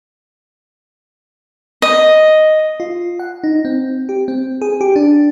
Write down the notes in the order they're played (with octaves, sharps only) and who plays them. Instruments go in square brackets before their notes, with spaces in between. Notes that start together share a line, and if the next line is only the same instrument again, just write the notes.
[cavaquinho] D#5
[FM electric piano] F4
F#5
D#4
C4
G4
C4
G#4
G4
D4